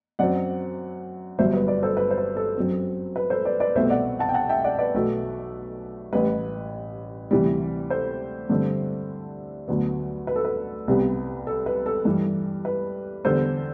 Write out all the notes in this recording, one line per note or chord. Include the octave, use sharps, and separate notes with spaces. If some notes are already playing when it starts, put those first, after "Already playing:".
F#2 F#3 C4 D5 F#5
G1 G2 F#3 C5 E5
B4
B4 D5
A4 C5
B4
C5
B4
A4
F#2 F#3 C4
B4
A4 C5
B4 D5
B4 D5
C2 B2 A3 C4 C5 E5
D5 F#5
F#5 A5
G5
F#5 A5
E5 G5
D5 F#5
B4 D5
B1 B2 F#3 A3
A1 A2 G3 B4
D2 C3 E3 G3
A4 C5
G2 D3 A3 C4
D2 D3 F#3 B3
B4
A4
B4
C2 C3 G3 B3
A4
B4
A4
G2 E3 G3
B4
E2 D3 G3 A4 C5